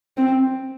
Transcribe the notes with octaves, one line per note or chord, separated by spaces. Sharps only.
C4